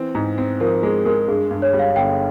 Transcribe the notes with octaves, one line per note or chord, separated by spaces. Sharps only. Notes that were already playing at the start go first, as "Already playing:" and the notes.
Already playing: E3 C4
G#2
C4
F3 A#4
G#3 G#4
G#3 A#4
G2 G#4
G2
C#5
G3
F5
G1 G5